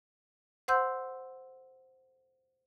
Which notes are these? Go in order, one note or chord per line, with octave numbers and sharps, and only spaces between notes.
C5 F#5 C6 E6 G6